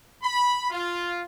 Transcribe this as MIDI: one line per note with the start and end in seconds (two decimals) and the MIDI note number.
0.23 0.67 83
0.70 1.22 65